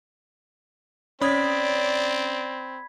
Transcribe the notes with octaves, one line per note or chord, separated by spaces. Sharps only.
C4 C#4 C#5 D5 B5 D#6 G#6 B6